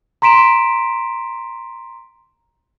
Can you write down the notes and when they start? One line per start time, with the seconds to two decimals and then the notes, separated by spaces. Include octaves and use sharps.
0.22 A#5 C6 B6 D7 E7